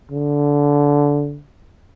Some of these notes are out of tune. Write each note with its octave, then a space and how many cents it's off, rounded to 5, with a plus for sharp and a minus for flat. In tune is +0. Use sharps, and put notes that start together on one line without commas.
D3 -15